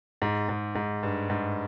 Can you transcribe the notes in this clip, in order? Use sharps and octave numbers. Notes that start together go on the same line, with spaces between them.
G#2
G#2
G#2
G2
G#2